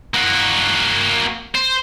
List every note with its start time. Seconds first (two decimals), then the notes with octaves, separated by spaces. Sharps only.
0.14 A#3 F#4
1.55 C5